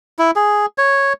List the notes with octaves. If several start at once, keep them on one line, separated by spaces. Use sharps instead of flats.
E4
G#4
C#5